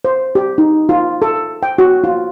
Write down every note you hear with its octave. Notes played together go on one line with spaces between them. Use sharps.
C5
G4
D#4
F4
A4
G5
F#4
F4